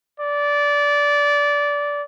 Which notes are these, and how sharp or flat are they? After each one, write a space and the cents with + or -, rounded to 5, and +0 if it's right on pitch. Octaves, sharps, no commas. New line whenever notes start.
D5 -20